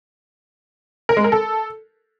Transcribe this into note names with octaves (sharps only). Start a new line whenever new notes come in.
A#4
G#3
A#4
A4